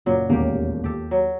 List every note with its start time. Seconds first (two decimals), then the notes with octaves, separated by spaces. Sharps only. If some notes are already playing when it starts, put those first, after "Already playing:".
0.06 F#1 A#2 F#3
0.29 E1 A1 D#2 A#3 G4
0.84 D#2 G4 A4
1.11 F#3